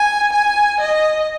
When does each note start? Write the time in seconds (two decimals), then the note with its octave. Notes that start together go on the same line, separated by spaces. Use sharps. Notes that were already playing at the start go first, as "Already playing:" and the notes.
Already playing: G#5
0.33 G#5
0.81 D#5